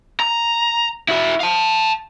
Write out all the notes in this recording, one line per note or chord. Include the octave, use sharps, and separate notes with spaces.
A#5
E4 F#4
F5 A5